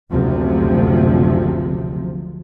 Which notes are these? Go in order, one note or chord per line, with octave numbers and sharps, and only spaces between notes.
F#1 D2 C3 F3